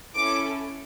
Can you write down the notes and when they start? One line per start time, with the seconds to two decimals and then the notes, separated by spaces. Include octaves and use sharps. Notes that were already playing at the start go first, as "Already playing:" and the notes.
0.15 C#4 E4 A4 D6